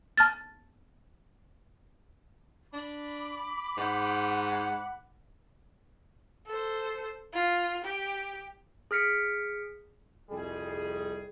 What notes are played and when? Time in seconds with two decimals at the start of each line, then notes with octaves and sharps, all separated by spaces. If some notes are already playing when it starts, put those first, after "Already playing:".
0.17 A5 F6 A6
2.73 D4 B5 D6
3.77 G#2 F#5
6.47 A4 C5
7.33 F4
7.84 G4
8.91 G#4 F6 B6 C#7 D7
10.31 C2 F2 G3 G#4